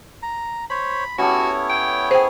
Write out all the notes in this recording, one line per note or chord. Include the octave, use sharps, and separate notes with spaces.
A#5
C5 C#5 B5
B3 C#4 E4 F#4 G4 A4 C#5
G5
G#4 C5 G5